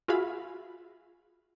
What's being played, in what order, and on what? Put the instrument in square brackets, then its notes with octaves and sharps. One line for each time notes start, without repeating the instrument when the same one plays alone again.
[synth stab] F4 F#4 G#4 E5 F5 B5